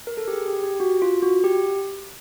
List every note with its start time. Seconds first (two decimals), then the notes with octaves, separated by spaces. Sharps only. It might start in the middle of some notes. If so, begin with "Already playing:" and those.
0.07 A#4
0.17 A4
0.28 G4
0.33 G#4
0.48 G4
0.64 G4
0.80 F#4
1.02 F4
1.23 F#4
1.44 G4